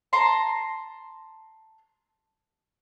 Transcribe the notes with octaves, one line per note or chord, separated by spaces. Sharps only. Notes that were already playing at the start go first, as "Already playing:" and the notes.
A5 A#5 C6